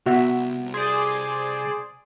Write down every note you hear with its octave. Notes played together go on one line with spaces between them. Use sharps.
C2 B3 F#4 E5
G#4 C5 D5 C6